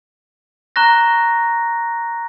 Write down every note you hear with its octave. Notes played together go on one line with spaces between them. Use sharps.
A#5 C#6 F#6 A#6